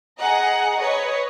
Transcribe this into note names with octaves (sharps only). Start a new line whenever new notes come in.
G#4 D#5 F#5 A#5
B4 C#5 D#5